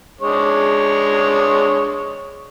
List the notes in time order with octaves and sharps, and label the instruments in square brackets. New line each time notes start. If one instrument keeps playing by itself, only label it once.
[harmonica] G#3 D4 C#5